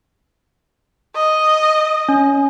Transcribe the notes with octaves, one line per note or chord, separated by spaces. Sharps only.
D#5
C#4